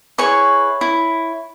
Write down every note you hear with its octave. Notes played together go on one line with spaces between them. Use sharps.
E4 G#4 B4 C#5 C#6
E4